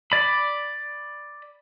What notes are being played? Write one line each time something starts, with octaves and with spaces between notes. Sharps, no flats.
D5 B5